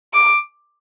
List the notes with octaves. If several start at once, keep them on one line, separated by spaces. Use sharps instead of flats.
D6